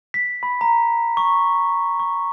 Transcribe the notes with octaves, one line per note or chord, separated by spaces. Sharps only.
B6
B5
A#5
C#6
C#6